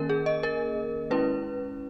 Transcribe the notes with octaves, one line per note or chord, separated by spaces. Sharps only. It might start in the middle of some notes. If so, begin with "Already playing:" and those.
Already playing: D#3 A#3 C#4 A#4
G#4
D#5
A#4
G#3 C#4 E4 B4